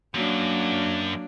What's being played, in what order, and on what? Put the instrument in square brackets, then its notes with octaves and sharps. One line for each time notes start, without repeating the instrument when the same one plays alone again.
[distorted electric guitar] F#2 [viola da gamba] F#3 A#3 D4